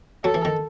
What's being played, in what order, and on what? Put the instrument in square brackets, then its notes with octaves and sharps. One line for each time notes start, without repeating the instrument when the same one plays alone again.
[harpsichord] F#3 [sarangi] A4
[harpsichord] E3
D#3